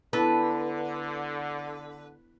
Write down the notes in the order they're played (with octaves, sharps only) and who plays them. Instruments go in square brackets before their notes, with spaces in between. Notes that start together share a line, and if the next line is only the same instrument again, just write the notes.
[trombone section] D3 [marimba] B3 E4 A4 [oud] D4 [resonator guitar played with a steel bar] B4